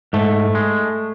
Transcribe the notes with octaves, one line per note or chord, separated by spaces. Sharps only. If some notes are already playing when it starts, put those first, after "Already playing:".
G#2 A3
G#3